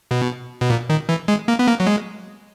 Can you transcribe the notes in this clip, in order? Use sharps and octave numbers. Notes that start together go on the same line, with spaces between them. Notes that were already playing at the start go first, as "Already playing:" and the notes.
B2
B2
A#2
D#3
E3
G#3
A#3
B3
A#3
F#3
G#3